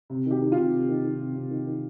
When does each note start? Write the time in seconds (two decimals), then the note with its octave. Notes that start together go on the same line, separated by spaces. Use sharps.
0.10 C3
0.26 D#3 G4
0.41 D#3
0.52 C3 F4
0.72 C3
0.88 D#3
1.04 D#3
1.19 C3
1.35 C3
1.50 D#3
1.66 D#3